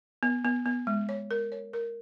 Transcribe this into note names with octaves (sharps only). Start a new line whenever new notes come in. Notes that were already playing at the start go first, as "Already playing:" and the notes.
B3
B3
B3
G#3
C#5
A#4
C#5
A#4